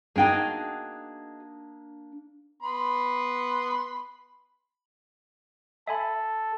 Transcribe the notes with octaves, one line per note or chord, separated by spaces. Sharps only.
A#3 D4 D#4 F#4 G#4 G5
B3 B5 C6
A4 E5 G#5 B5